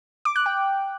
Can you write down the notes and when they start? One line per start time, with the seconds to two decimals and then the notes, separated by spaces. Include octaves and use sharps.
0.25 D6
0.36 F#6
0.46 G5